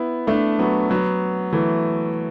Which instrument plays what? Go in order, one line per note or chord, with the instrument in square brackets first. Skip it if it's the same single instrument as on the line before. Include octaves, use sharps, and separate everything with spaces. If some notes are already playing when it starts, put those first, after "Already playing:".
Already playing: [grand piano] B3 E4
A3 D4
F#3 B3
F#3 B3
E3 A3